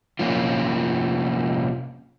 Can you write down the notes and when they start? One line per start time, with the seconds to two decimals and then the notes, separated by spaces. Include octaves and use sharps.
0.19 C3 F3 A#3 C#4 F4